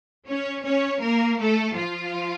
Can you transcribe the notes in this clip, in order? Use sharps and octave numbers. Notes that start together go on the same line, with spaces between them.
C#4 C#5
C#4 C#5
A#3 A#4
A3 A4
F3 F4